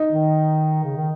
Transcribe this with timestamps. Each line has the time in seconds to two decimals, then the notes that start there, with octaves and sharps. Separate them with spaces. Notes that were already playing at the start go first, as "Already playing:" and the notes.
Already playing: D#4
0.11 D#3
0.83 C#3
0.96 D#3